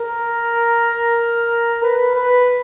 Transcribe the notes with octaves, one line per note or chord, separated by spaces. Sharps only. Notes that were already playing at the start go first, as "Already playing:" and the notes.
Already playing: A#4
B4
B4